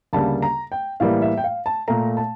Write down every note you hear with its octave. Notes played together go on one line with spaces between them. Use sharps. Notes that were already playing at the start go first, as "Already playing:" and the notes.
D2 C#3 G3 A#3 A5
A#5
G5
A2 E3 G3 A#3 F5
E5
G5
F5
A5
A#2 A3 A#5
A5